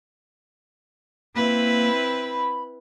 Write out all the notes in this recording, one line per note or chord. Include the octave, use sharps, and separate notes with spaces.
A#3 C4 E4 B4
B5